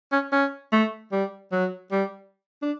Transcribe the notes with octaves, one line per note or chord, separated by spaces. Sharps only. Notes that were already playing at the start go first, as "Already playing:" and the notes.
C#4
C#4
A3
G3
F#3
G3
D4